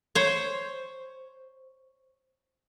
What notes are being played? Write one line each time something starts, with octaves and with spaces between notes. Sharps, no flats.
C5 C#5